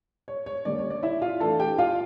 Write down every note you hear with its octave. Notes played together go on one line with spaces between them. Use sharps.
C#5
C#5
D3 G3 A#3 C#4 D5
C#5
D5
E4 E5
F4 F5
E3 A3 D4 A4 A5
G4 G5
F4 F5